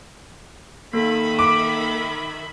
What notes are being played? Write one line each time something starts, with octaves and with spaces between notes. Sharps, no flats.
D#3 A#3 A4 E5 B5
D6